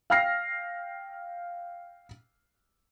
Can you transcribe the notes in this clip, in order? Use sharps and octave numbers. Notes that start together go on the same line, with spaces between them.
F5 G5 F6 A#6 C7